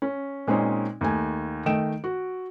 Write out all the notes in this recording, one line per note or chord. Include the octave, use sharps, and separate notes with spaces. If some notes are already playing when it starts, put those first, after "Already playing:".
C#4
A#2 G#3 C4 C#4 D#4
D#2 A3 G#5
D#3 A3 D#5 G5 D7 E7
F#4